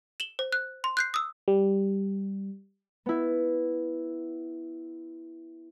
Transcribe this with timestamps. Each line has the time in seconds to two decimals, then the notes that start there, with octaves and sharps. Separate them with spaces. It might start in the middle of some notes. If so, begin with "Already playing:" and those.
0.20 E7 F#7 G7
0.39 C5
0.52 F#6
0.84 C6
0.97 F#6 G6 C7
1.14 D#6 E6
1.48 G3
3.06 B3 E4